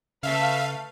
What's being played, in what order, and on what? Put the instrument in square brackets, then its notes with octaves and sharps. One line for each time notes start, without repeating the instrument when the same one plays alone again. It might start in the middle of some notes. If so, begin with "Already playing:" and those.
[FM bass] C#3 [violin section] A3 A4 B4 [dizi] E5 [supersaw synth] F5